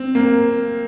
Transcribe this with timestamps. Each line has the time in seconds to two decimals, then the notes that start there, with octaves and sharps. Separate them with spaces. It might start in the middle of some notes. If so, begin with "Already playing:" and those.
Already playing: C4
0.15 A#3